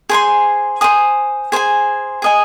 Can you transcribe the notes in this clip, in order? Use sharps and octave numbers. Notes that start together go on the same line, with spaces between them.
G#4 C5 G#5 C6
C5 G#5 D#6
G#4 C5 G#5
G#4 D#5 G#5